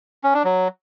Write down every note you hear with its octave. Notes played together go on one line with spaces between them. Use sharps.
C#4
D4
F#3